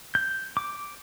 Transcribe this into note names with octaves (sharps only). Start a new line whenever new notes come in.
G6
D6